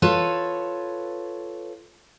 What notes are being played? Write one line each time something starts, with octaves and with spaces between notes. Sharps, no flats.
F4 A4 B4 C#5